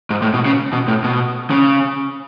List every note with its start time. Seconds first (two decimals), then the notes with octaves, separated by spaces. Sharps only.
0.10 G#2
0.22 A2
0.34 B2
0.46 C#3
0.73 B2
0.88 A2
1.04 B2
1.50 C#3